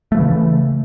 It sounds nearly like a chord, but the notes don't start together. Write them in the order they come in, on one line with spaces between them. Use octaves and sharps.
A3 F3 E3 C#3